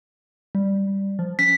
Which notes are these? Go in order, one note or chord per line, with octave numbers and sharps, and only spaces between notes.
G3
F3
C#4 B6